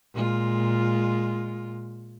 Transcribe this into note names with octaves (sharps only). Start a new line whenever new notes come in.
A#2 G#3 F4